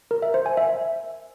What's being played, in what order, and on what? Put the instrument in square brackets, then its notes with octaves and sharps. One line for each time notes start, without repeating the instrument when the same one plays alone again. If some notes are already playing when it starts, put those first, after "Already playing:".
[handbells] A#4
E5
C5
G#5
E5